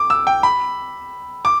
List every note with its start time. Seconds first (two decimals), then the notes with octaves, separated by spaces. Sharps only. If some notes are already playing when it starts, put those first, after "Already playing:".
Already playing: D6
0.10 E6
0.27 G5
0.43 B5
1.45 D6